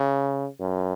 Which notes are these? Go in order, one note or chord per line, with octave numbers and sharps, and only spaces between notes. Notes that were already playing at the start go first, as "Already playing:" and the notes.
Already playing: C#3
F#2